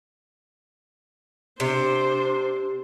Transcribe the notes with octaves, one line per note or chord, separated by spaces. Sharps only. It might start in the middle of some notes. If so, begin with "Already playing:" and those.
C3 D4 C5